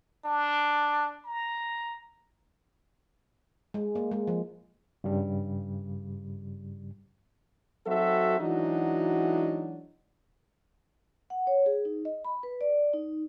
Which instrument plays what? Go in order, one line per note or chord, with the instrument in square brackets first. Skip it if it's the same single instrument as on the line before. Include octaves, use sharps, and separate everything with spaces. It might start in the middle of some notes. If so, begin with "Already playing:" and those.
[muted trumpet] D4
A#5
[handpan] G#3
A#3
G#3
F3
[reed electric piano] G2 C#3 G3
[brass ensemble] F#3 C4 D#4 F#4 A4 E5
E3 F#3 G#3 D4 D#4 F#4
[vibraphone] F#5
C#5
G#4
D#4
D#5
B5
B4
D5
D#4